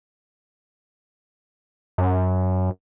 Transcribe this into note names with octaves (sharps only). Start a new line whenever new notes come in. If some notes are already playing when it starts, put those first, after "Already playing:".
F#2